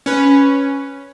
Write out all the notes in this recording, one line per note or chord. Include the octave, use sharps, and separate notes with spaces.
C#4 B4